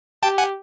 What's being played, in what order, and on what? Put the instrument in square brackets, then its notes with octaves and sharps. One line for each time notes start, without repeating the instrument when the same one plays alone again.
[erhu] G4 [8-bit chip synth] G5 A5
[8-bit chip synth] F#5 G#5